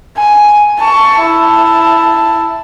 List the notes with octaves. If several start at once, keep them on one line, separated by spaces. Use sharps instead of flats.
G#5
A5 C#6
E4 A5